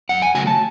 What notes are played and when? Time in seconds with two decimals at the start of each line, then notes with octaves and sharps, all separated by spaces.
0.09 F#2 F#5
0.22 G#5
0.35 C#3 F#3 A3 G#5
0.47 A5